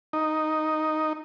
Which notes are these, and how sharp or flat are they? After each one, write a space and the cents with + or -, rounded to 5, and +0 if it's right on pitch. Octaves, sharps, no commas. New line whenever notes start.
D#4 +0